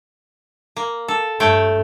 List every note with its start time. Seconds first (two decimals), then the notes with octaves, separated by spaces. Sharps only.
0.77 A#3
1.08 A4
1.40 G2 A3 C#5 G5